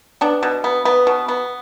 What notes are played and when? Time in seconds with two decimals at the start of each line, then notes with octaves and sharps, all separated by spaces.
0.21 B3 D4
0.43 B2
0.64 B3
0.85 B3
1.07 B2
1.28 B3